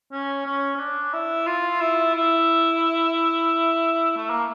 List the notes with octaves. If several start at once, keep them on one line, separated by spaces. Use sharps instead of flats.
C#4
C#4
C#4
D4
E4
F4
E4
E4
A3
A#3